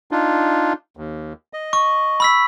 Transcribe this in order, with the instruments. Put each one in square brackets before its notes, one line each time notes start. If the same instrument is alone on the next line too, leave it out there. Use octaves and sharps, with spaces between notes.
[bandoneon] D4 D#4 F4
D#2
D#5
[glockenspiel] C#6
B5 E6 B6